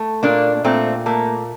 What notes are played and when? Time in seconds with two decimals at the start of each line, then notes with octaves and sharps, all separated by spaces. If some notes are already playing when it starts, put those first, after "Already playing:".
Already playing: A3
0.23 A#2 A#3 D4
0.64 A#2 A3 C4
1.06 A3 A#3